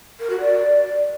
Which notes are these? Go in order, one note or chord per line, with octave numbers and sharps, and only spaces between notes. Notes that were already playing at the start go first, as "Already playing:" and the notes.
A#4
F#4
D5